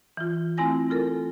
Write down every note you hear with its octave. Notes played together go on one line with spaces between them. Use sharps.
E3 F4
A3 C4 E4 G#5 A#6
F4 A4 A#4